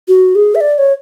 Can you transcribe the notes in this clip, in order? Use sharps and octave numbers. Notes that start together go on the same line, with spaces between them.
F#4
G#4
E5
D5
C#5